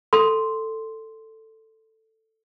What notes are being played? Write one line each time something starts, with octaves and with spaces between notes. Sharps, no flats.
A4 C6